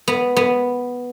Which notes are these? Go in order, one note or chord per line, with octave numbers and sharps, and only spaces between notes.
B3
B3